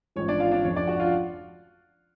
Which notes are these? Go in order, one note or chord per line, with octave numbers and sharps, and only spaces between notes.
A1 G#2 F3 C#5
D4 D5
F4 F5
D4 D5
F1 F2 F3 C#5
D4 D5
F#4 F#5
F4 F5